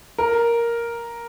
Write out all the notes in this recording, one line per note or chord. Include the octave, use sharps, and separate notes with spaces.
A#4